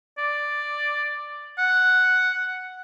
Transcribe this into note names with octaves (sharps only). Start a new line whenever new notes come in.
D5
F#5